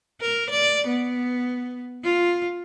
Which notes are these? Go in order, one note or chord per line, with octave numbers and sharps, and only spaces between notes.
A#4
D5
B3
F4